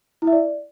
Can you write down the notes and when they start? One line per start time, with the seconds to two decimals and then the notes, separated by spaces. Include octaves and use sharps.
0.22 E4
0.27 E5
0.33 D5